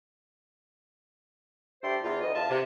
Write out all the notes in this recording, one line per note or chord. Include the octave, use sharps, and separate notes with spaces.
G2 A3 G4 C5 D5 C6
E2 F4
D2 D#5
E2 F4 E5 A5
C3